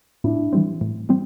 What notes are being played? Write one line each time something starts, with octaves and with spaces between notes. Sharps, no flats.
A2 D4 E4
E3 G3 C4
A2
E3 G3 C4